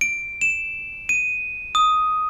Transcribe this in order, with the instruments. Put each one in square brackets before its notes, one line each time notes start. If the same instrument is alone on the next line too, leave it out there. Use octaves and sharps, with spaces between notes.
[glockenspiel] D7
E7
D#7
D#6